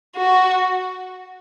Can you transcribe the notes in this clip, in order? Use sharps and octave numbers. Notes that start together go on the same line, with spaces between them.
F#4